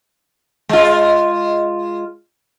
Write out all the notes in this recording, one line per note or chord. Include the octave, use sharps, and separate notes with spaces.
G#3 F4